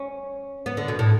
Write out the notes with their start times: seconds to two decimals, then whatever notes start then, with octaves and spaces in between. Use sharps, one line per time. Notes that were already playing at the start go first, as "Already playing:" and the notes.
Already playing: C#4
0.66 B3
0.77 D3
0.88 B2
0.99 A2